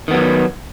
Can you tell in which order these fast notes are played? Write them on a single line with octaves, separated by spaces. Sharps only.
D#3 B3 F#3